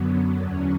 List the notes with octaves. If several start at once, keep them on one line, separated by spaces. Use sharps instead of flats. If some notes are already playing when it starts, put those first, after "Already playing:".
Already playing: F#2 D3 F#3 B3
E2 D3 F#3 C#4